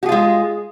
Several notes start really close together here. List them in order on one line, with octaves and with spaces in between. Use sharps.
F#4 G#4 F4 G#3